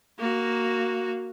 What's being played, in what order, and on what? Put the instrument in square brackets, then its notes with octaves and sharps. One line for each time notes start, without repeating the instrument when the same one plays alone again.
[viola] A#3 F#4